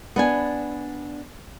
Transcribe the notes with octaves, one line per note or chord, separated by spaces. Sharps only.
B3 D4 G#5